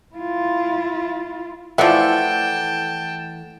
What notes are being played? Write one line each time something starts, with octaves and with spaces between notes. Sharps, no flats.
E4 F4
E3 F3 A3 D5 E5 F#5 G5 A5